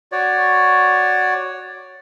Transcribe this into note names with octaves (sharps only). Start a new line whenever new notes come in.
F#4 C#5 D5